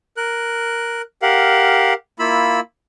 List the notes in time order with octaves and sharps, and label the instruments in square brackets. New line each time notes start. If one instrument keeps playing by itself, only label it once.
[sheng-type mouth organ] A#4 F#6
G4 A#4 F5 F#5
A#3 E4 F4 B5 E6